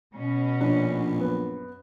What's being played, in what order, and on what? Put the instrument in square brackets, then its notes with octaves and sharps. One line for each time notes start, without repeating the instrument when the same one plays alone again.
[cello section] B2 C#4
[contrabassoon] A#1 [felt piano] D4
[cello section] F#2 [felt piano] B3